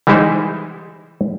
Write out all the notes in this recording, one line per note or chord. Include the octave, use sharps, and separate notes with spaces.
E3 G3 G#3 D#4 E4 C5